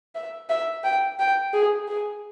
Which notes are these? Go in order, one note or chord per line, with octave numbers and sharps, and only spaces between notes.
E5
E5
G5
G5
G#4
G#4